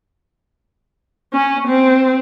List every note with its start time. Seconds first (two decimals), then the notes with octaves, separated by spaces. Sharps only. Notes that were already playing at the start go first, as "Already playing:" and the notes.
1.33 C#4
1.68 C4